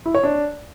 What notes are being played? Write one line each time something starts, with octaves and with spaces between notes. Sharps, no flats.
E4
C#5
D4